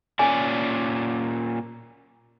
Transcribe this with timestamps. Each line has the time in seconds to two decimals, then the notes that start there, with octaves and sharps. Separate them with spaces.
0.19 A#2 C#4 D5 G#5